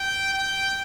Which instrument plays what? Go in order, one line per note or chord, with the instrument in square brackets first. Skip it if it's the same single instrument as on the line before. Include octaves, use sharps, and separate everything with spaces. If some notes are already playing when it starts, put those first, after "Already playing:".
Already playing: [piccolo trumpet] G5
G5